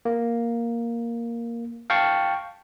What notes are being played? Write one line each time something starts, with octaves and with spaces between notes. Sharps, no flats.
A#3
F5 G5 A5 C#6